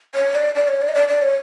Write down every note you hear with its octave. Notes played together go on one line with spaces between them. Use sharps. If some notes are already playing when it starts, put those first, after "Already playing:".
C#5
D5
D5
C#5
D5
D#5
D5
D5
C#5